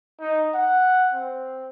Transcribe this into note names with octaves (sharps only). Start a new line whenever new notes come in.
D#4
F#5
C4